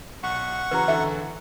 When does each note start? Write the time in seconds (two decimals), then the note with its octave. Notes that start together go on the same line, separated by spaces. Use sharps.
0.23 B1 F#5 C#6
0.71 C#3 E3 F#4 B4 A#5
0.88 D3 E3 A4 E5